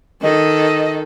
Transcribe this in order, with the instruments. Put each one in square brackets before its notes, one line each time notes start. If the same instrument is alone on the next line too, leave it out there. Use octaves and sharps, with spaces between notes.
[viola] D#3 A4 [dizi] D#5